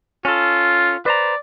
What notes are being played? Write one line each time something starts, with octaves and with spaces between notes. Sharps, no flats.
C#4 F4 A4
B4 C5 D5 A#5